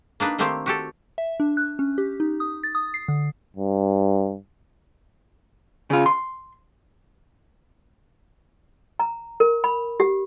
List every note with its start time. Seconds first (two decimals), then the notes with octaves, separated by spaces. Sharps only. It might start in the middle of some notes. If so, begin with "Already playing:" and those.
0.20 A#3 D4 D#4 B4
0.39 D#3 A3 A#3 C4 G4 C5
0.66 F#4 G4 A4
1.18 E5
1.40 D4
1.57 F#6
1.79 C#4
1.98 G4
2.20 D#4
2.40 D#6
2.64 A6
2.75 D#6
2.94 C7
3.08 D3
3.57 G2
5.90 C#3 F4
6.06 C6
9.00 A#5
9.40 A#4
9.64 B5
10.00 G4